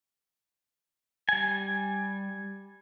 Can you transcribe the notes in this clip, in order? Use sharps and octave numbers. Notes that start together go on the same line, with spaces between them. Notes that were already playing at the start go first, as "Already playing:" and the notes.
G3 G#5